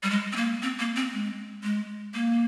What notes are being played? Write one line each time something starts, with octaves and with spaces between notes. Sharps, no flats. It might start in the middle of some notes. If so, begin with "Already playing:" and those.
G3
G#3
C4
A#3
C4
A#3
C4
G#3
G#3
A#3